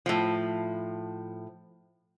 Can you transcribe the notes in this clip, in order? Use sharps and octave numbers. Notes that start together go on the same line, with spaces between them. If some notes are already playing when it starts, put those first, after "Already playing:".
A2 F3